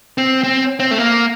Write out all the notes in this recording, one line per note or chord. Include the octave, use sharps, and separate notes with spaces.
C4
C4
C4
A3
A#3